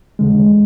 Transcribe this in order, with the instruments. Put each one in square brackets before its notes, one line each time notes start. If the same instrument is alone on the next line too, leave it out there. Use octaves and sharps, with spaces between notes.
[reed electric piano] E2 D3 G#3